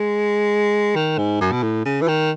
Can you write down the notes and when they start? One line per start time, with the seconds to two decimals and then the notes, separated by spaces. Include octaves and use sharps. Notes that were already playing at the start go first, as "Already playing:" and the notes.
Already playing: G#3
0.95 D#3
1.18 G#2
1.41 F#2
1.52 B2
1.63 A2
1.85 C#3
2.01 E3
2.08 D#3